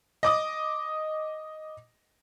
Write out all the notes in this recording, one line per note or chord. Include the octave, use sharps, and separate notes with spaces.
D#5 D6 D#6